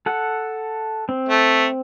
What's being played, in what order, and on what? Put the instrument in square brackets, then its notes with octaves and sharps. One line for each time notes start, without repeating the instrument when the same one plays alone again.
[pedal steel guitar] A4 F#5
C4
[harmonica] A3